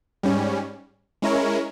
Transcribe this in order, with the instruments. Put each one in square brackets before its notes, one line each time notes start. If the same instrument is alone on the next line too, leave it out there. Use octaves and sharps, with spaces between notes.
[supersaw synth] G#2 G3 C#4
G#3 C#4 E4 A#4 C#5